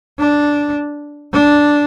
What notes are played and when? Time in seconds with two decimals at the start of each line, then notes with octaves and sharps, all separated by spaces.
0.18 D4
1.33 D4